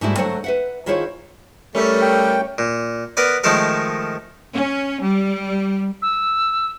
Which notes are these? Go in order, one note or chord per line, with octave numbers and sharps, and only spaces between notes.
G#2 G3 A3 D#4 E4 F#4
D3 F#3 A3 A4 C5 F#5
B4 E5 F#5
D#3 E4 F4 G#4 C5 C#5
G3 A3 C#4 A#4
G5
A#2
B3 A#4 B4 D5
D#3 F3 G#3 A3 A4 A#4
C#4
G3
E6